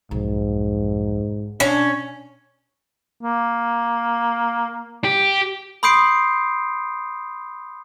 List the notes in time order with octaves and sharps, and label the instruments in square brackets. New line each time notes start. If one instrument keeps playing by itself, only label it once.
[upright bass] B1 F2 [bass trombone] G#2
[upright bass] B2 [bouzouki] C#4 [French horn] D4
[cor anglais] A#3
[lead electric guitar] G4
[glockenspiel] B5 C6 D#6 G6 C7 D7